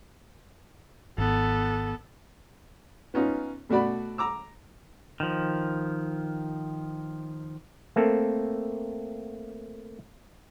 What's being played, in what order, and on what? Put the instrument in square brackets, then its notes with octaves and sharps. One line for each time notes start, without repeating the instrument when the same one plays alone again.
[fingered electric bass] G#1 [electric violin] B3 A4
[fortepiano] B3 C#4 D#4 F4
B2 A3 F#4 D5 B5
A#5 D6 E6
[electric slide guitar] D#3 F3
[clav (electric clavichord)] A3 A#3 C4 A4